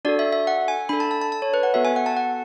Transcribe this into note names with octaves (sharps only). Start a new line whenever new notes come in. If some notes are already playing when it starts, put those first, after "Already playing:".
D4 F#4 A4 D5
E5
E5
F#5
G#5
D4 A4 B5
A5
A5
A5
A5
C#5
B4
F#5
B3 F#4 A4 E5
G#5
F#5
A5
F#5